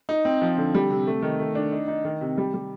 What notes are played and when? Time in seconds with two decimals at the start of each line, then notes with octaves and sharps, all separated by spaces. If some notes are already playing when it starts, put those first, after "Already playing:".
0.09 D#4
0.25 C4
0.42 F3
0.58 D3
0.75 G3
0.90 C3
1.07 A3
1.22 D#3
1.39 A3
1.55 D4
1.72 D#4
1.88 D#4
2.05 D#3
2.21 C3
2.38 G3
2.54 G3